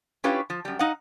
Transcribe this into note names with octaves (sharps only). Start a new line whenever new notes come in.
C#4 E4 F4 G4 B4 C#5
F3
F#2 G3
D#4 D#5 F5 F#5